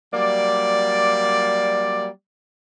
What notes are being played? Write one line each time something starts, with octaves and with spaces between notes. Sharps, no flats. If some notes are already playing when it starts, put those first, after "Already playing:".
F#3 G3 A#3 D5